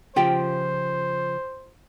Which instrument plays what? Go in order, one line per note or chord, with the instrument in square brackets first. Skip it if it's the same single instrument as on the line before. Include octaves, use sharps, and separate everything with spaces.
[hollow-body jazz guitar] C#3 F3 G4 [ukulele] F4 G5 [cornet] C5